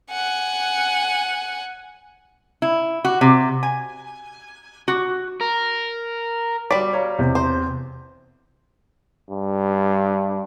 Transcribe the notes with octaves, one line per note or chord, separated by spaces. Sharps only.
F#5 G#5
E4
F#4
C3
G#5
F#4
A#4
G3 F#4 D5 B6
C#5 F5 A#5
E2 C3
C5
G2